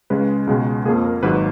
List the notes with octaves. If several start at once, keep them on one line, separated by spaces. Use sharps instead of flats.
C#2 C#3 G#3 B4
C#2 B2 G#3 C#4
F2 F3 A#3 G#4
A#4
G#1 G#2 F#3 B4